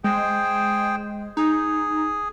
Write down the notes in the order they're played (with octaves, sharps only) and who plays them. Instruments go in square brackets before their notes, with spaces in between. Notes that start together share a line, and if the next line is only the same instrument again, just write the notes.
[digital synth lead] G#3 [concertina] G#4 C5 G5
[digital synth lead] D#4 [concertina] G#4